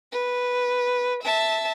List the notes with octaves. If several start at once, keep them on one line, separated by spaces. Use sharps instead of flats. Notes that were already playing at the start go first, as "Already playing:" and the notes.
B4
E5 A5